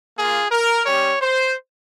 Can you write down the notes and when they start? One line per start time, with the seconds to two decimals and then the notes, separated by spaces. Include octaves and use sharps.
0.16 A#3 F4 G#4
0.51 A#4
0.86 G3 C#4 G4 C#5
1.21 C5